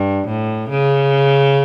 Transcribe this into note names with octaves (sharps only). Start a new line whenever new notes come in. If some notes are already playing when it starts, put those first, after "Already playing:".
Already playing: G2
A2
C#3